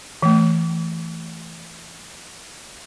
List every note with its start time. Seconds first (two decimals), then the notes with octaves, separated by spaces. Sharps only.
0.22 E3 A3